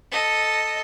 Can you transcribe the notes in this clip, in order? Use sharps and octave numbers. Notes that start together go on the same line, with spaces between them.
A4 D#5